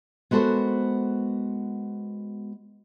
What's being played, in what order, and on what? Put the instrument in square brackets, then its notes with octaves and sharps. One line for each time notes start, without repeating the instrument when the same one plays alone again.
[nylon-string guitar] G#3 B3 F#4 A4 A#4 C5